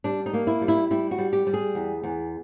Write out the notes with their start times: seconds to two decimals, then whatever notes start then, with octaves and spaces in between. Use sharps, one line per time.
0.04 G3 D4
0.26 D#4
0.33 A#3
0.47 E4
0.61 G3
0.68 E4
0.91 G3 E4
1.11 F#4
1.18 G3
1.33 G4
1.47 G3
1.54 G#4
1.75 E2
2.03 E2